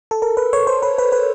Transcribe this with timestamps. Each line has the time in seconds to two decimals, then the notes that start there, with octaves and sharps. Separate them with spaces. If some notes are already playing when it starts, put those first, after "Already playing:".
0.11 A4
0.22 A#4
0.37 B4
0.53 C#5
0.67 C5
0.83 B4
0.98 B4
1.12 B4